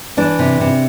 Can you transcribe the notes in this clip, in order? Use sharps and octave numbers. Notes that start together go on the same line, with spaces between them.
E3 D4
C3
C3